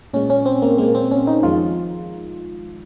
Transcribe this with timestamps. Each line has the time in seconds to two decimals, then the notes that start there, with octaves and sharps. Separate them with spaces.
0.14 A#2 G#3 C#4
0.30 C#4
0.46 C4
0.62 A#3
0.78 A#2 G#3 A#3
0.95 C4
1.11 C#4
1.27 D#4
1.43 F2 D#3 G#3 F4